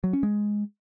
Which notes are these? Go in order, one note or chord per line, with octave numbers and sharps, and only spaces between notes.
F#3
C#4
G#3